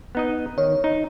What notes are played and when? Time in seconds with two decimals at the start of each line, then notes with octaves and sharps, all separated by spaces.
0.15 B3 D#4 D#5
0.58 D#3 C#5
0.84 D#4